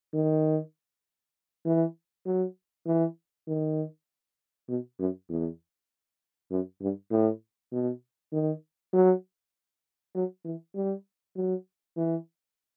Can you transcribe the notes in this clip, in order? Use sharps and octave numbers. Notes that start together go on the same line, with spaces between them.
D#3
E3
F#3
E3
D#3
B2
F#2
E2
F#2
G2
A2
B2
D#3
F#3
F#3
E3
G3
F#3
E3